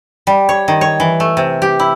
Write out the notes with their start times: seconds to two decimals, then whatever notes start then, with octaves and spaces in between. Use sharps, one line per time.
0.27 G3
0.49 C#5
0.68 D#3
0.81 C#5
1.00 E3
1.20 A3
1.37 C3
1.62 G4
1.79 E4